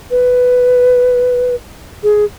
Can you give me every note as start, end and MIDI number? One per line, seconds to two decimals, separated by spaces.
0.11 1.55 71
2.03 2.25 68